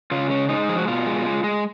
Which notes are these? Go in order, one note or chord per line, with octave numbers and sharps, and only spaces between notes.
C#3 F4
G#3 C#4
G#3 D#4
F3 G#4
F#4
B2 F4
G#3
G#3
G#3